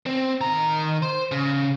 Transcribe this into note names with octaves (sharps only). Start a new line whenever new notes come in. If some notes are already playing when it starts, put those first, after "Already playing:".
C4
D#3 A#5
C5
C#3